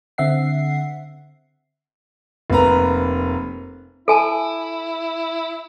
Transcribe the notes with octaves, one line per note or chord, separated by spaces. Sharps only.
D3 C4 E5 F#5 C7
F1 A#3 B4 A#5
E4 A4 G#5 A5